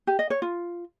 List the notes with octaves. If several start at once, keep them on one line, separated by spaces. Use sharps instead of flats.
G4
D#5
C#5
F4